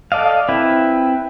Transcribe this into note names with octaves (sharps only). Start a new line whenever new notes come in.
A4 D5 D#5 F5
C4 E4 B4